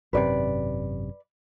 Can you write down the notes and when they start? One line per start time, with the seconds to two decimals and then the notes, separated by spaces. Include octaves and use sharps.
0.13 G#1 F#2 C3 B4 D5